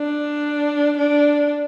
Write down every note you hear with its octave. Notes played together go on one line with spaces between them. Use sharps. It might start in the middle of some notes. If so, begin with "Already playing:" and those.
Already playing: D4
D4